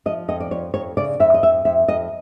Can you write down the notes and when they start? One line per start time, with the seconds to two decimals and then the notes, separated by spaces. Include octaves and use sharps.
0.06 F3 D#5
0.28 F2 D#5
0.40 D5
0.51 F2 C#5
0.74 F2 C#5
0.97 C#3 D5
1.20 F2 E5
1.34 D#5
1.43 F2 E5
1.65 F2 E5
1.88 F2 D#5